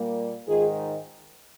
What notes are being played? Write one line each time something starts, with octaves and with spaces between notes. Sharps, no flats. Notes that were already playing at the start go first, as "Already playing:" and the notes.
Already playing: A#2 G3 A#3
G#2 D#3 G#3 F4 G#4